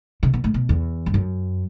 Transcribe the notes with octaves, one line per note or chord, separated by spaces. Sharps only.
C3
B2
A2
B2
E2
G2
F#2